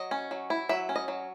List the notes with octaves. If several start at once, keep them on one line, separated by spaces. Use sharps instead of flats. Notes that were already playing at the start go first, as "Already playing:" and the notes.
Already playing: F#3 D#5
C#4
F#3
E4
F#3 E5
C#4
D#5
F#3